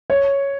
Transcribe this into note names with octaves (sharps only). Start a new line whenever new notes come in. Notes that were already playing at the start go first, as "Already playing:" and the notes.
C#5